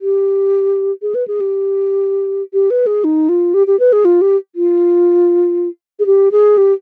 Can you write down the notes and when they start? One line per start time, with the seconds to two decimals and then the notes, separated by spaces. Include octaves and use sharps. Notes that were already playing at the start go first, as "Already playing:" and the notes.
0.01 G4
1.02 G#4
1.15 B4
1.28 G#4
1.40 G4
2.53 G4
2.70 B4
2.86 G#4
3.04 D#4
3.29 F4
3.54 G4
3.67 G4
3.79 B4
3.93 G#4
4.05 F4
4.21 G4
4.55 F4
5.99 G#4
6.06 G4
6.32 G#4
6.57 G4